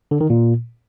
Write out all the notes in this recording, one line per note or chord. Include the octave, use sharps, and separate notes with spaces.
D3
D#3
A#2